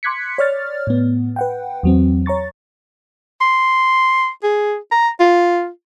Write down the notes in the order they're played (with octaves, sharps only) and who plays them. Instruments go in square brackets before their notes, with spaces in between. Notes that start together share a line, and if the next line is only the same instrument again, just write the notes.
[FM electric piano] C6 D6 F#6 G#6 B6 C#7
C#5 D5 F6 A6
A2 B3
B4 F#5 G5
E2 F#3 C4
C#5 A#5 C#6 A6
[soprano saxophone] C6
G#4
A#5
F4